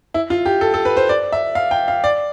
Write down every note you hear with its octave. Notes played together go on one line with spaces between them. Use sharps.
E4
F4
G4
A4
A4
B4
C5
D5
E5
F5
G5
F5
D5